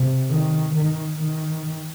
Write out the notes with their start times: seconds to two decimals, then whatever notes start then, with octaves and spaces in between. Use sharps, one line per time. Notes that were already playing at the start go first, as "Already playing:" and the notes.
Already playing: C3
0.30 D#3
0.75 D#3
1.20 D#3